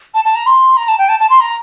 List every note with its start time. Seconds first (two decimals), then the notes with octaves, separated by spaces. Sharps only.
0.14 A5
0.25 A5
0.35 A#5
0.46 C6
0.77 A#5
0.88 A5
0.98 G5
1.09 A5
1.20 A5
1.30 C6
1.41 A#5